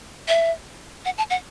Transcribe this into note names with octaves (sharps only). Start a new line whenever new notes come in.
E5
F#5
A5
F#5